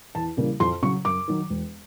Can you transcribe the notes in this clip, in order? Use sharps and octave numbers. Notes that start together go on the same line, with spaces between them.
E2 A5
C#3 E3 G3 A#3
F2 C6
C#3 F#3 C#6
F#2 D6
D#3 F#3
E1